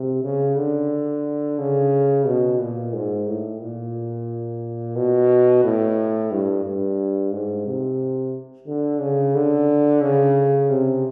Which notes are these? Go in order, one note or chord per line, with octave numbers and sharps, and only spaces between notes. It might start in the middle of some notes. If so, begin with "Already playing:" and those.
Already playing: C3
C#3
D3
C#3
B2
A#2
G#2
A2
A#2
B2
A2
G2
G2
G#2
C3
D3
C#3
D3
C#3
C3